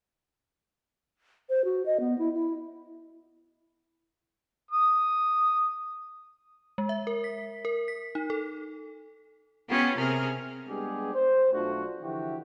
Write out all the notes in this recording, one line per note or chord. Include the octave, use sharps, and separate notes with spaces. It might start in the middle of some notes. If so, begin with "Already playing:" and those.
C5
F#4
D#5
B3
E4
E4
D#6
G#3
E5
A#4
B6
A#4
B6
D#4
A4
B3 C#4 F4 G4
C3 G#4 A#4 F6
G3 G#3 B3 D4 G4 G#4
C5
B1 A3 D4 F4 F#4
D3 E3 F3 E4 F#4 G4